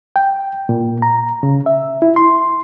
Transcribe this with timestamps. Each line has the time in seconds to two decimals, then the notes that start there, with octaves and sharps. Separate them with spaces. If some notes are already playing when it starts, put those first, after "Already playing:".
0.16 G5
0.69 A#2
1.02 A#5
1.43 C#3
1.66 E5
2.02 E4
2.16 C6